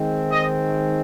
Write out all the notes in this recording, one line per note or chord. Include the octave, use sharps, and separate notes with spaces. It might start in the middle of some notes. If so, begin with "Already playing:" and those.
Already playing: D#3 G#3 C4
D#5